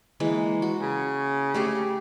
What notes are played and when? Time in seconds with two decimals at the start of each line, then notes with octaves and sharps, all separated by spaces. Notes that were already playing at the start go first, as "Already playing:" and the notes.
0.20 E3 G#3 A#3
0.62 F#4
0.82 C#3
1.54 A3 G4 G#4